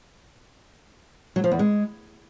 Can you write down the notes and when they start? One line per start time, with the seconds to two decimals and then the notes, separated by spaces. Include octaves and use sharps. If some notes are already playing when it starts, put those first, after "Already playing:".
1.36 F#3
1.44 F3
1.52 E2
1.59 G#3